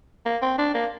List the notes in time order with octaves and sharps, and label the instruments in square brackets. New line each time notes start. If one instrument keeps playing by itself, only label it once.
[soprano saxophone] A#3
C4
D4
A#3